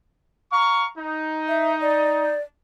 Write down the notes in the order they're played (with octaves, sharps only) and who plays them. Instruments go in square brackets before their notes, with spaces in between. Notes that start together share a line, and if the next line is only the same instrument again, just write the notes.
[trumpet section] F5 A#5 C#6
D#4
[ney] E5
D5